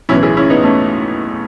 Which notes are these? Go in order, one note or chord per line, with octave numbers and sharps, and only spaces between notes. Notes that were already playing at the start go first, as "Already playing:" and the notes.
B1 A2 E3 C#4 E4
E4 G#4
C#4 E4
B3 D#4
A3 C#4